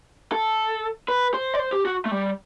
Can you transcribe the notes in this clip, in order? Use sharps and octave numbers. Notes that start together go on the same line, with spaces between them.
A4
B4
C5
D5
C5
G4
F#4
A3
G3